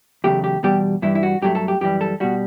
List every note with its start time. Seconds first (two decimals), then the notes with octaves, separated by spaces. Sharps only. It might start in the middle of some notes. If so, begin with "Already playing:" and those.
0.24 E2 C#3 F#3 A3 G4
0.44 G4
0.63 E2 B2 G3 G4
1.02 G2 E3 G3 E4
1.15 E4
1.23 F#4
1.42 G2 F#3 A3 G4
1.55 A4
1.68 G4
1.81 F#2 E3 G3 G4
2.01 A4
2.20 B2 G3 F#4